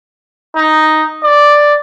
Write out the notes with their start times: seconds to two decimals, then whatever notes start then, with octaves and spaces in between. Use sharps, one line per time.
0.57 D#4
1.23 D5